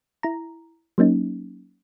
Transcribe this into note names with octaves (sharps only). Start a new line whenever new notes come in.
E4 A#5
F#3 A#3 C#4 D#4